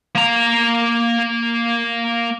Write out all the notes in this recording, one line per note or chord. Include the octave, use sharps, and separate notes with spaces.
A#3 A#5